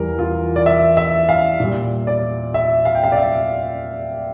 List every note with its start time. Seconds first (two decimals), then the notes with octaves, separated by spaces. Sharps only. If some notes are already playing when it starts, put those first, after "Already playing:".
Already playing: E2 E3 G3 A#4
0.19 F4
0.56 D5
0.66 E5
0.97 E5
1.29 F5
1.60 A#2 G3
2.07 D5
2.54 E5
2.85 F5
2.95 G5
3.04 F5
3.12 D5
3.17 E5